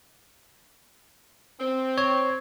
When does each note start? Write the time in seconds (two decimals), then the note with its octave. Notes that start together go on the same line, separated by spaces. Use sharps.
1.60 C4
1.98 C#5